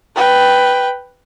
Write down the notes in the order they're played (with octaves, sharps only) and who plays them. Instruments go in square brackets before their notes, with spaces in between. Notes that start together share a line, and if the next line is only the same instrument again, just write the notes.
[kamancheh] B4 G5